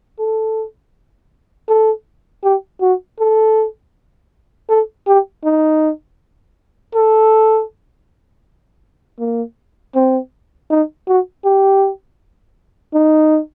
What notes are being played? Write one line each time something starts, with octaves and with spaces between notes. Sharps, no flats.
A4
A4
G4
F#4
A4
A4
G4
D#4
A4
A#3
C4
D#4
F#4
G4
D#4